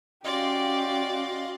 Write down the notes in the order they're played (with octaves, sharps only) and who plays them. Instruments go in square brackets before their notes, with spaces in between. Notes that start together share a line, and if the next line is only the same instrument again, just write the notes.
[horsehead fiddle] C#4 F#4 [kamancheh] G4 [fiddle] D5 [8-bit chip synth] D#5 F5 C6